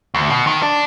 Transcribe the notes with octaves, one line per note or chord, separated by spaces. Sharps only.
D2
B2
D#3
D4